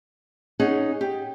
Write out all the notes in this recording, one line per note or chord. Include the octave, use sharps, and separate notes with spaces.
C#4 D#4 G#4 F#5
G4